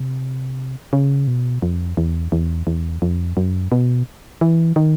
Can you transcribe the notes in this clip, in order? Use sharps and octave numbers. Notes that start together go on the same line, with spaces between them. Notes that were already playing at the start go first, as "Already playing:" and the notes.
Already playing: C3
C#3
B2
F2
E2
E2
E2
F2
F#2
B2
E3
D#3